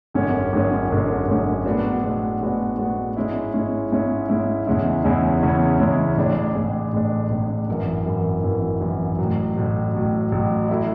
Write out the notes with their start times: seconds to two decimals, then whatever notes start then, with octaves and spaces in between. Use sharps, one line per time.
0.14 G#1 F#2 D3 G#3 C#4
0.53 G#1 F#2 D3 G#3 C#4
0.90 G#1 F#2 D3 G#3 C#4
1.28 G#1 F#2 D3 G#3 C#4
1.65 A2 G#3 B3 D4 F#4
2.04 A2 G#3 B3 D4 F#4
2.41 A2 G#3 B3 D4 F#4
2.78 A2 G#3 B3 D4 F#4
3.17 G#2 G#3 C#4 E4
3.54 G#2 G#3 C#4 E4
3.92 G#2 G#3 C#4 E4
4.29 G#2 G#3 C#4 E4
4.67 E2 C#3 G#3 C#4 E4
5.04 E2 C#3 G#3 C#4 E4
5.41 E2 C#3 G#3 C#4 E4
5.80 E2 C#3 G#3 C#4 E4
6.17 A1 A2 G#3 D4
6.55 A1 A2 G#3 D4
6.93 A1 A2 G#3 D4
7.30 A1 A2 G#3 D4
7.68 G#1 F#2 E3
8.06 G#1 F#2 E3
8.44 G#1 F#2 E3
8.81 G#1 F#2 E3
9.19 A1 A2 F#3
9.57 A1 A2 F#3
9.94 A1 A2 F#3
10.32 A1 A2 F#3
10.69 F#3 A3 E4